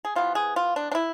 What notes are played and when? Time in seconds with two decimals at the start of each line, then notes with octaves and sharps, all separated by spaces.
0.05 G#4
0.15 C3 E3 B3 F4
0.35 G#4
0.56 F4
0.76 D4
0.92 D4
0.95 E4